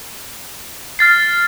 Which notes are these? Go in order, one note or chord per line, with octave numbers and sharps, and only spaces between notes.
F6 A6 C7